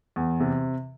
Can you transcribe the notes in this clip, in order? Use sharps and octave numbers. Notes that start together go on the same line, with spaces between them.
E2
C3